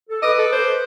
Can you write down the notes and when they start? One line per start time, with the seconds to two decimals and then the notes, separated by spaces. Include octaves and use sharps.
0.10 A4
0.22 B4 D#5 D6
0.39 A4
0.52 C5